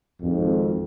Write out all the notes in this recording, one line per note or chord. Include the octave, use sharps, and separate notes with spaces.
G#1 F2